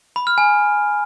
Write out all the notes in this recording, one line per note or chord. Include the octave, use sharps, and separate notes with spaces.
B5
F6
G#5